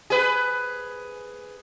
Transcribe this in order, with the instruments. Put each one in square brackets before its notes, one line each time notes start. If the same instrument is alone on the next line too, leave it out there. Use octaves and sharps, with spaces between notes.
[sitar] G#4 B4